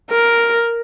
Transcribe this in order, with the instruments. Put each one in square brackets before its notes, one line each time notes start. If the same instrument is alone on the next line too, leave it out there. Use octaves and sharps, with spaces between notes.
[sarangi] A#4